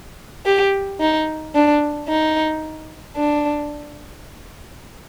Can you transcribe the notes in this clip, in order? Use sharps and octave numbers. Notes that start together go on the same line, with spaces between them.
G4
D#4
D4
D#4
D4